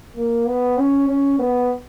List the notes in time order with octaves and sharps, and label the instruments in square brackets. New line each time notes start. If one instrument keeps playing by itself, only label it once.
[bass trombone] A#3
B3
C#4
C#4
B3